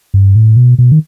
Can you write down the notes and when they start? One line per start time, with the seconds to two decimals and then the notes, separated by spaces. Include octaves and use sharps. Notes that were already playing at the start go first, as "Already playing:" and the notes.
0.14 G2
0.36 A2
0.56 B2
0.78 B2
0.92 D#3